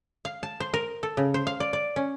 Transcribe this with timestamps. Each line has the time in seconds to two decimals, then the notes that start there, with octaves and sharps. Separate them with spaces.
0.25 F5
0.43 A5
0.60 C5
0.74 A#4
1.03 A4
1.17 C#3
1.34 C5
1.47 F5
1.60 D5
1.73 D5
1.96 C#4